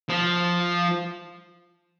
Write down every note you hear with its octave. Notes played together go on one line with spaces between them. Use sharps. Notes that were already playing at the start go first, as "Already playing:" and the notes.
F3